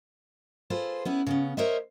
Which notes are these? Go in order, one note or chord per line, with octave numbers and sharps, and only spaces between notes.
F4 G#4 A4 B4 C5
B3 C#4 E4
C#3 B3 C#4
A#4 C5 C#5 D#5 E5